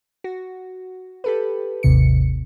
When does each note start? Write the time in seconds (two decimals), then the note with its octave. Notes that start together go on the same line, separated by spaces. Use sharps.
0.24 F#4
1.24 G4 A4 B4
1.83 G#1 D#2 C3 C#7